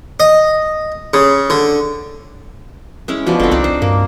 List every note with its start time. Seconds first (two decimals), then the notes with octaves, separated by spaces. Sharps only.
0.20 D#5
1.14 C#3
1.50 D3
3.08 G#3 C#4 E4
3.26 B2 F3 D5
3.40 F#1 D3 C4
3.51 C2 D4 D#4 D5
3.64 C5
3.82 G2 A#3